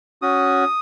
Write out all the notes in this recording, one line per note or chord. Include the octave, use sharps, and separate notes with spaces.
C#4 F#4 D#6